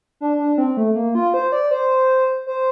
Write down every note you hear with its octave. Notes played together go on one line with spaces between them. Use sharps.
D4
D4
C4
A3
A#3
F4
C5
D5
C5
C5